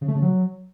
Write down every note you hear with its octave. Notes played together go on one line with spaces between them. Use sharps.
C#3
A3
C#3
F#3